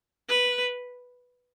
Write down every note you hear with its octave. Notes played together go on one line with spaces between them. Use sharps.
B4